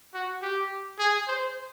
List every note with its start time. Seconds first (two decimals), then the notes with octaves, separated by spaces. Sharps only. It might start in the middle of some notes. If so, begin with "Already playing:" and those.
0.14 F#4
0.42 G4
0.99 G#4
1.28 C5